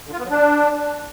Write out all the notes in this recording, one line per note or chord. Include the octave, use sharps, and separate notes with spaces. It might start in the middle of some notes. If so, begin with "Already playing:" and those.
D3
F4
B3
F#3
D4